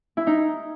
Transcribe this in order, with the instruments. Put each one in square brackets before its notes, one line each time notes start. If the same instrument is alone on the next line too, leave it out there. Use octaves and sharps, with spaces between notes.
[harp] E4
D#4